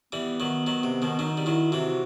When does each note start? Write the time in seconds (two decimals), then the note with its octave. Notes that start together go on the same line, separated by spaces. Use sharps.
0.12 E3 G3 B3
0.40 D#3 F#3
0.67 D#3 F#3
0.83 C3
1.02 B2 D#3
1.19 D#3 F#3 D#4
1.37 G3
1.46 D#3 F#3 E4
1.72 C3 E3 F#4